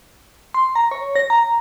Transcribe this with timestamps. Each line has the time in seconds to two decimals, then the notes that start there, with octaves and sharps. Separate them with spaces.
0.54 C6
0.75 A#5
0.91 C#5
1.16 A#6
1.30 A#5